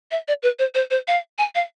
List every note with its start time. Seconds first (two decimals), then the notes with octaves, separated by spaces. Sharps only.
0.11 E5
0.28 D5
0.43 B4
0.59 C5
0.74 C5
0.90 C5
1.08 F5
1.38 G#5
1.55 F5